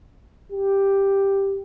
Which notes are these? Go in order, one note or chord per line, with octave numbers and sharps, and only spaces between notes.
G4